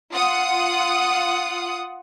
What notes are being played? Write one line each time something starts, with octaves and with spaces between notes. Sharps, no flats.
F4 F#5 D#6